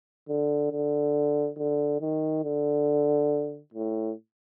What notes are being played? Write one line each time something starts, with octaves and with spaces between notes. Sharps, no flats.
D3
D3
D3
D#3
D3
A2